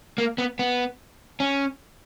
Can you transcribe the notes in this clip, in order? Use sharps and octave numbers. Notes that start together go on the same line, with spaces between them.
A#3
B3
B3
C#4